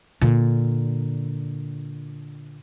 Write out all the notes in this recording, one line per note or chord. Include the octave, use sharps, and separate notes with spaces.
A#2 D3